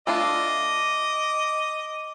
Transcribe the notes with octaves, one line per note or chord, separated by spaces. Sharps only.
A3 D4 F4 D#5 D6